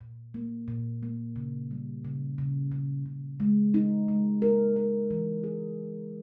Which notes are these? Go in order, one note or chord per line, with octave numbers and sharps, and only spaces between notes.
A#2
A#3
A#2
A#3
C#3
G3
C#3
C#3
C#3
C#3
G#3
D#4
G#3
A#4
A#4
E3
G#4